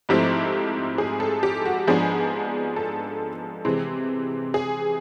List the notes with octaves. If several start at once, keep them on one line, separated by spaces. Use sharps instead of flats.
G#2 F3 A3 C4 E4 G4
G#4
A4
G4
F#4
G#2 F3 G#3 B3 D4 G#4
A4
C3 E3 G#3 C4
G#4